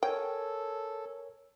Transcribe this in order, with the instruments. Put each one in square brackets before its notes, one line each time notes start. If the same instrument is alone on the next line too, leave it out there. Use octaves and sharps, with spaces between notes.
[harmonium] A4 [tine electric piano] A#4 C#5 G#5 [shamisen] G5